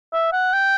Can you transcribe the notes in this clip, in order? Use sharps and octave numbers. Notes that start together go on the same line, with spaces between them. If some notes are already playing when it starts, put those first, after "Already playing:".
E5
F#5
G5